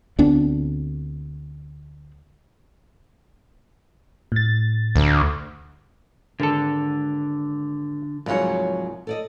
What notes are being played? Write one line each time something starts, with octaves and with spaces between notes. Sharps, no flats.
D2 B3 C4 D4
A2 A6
D2
G#1 D3 A4
C2 G#2 F3 F#3 C#5
A4 D5 D#5